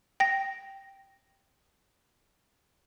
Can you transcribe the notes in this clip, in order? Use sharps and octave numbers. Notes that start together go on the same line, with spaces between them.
G5 A#6